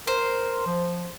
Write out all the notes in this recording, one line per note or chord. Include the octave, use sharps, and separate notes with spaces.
A#4 C5
F3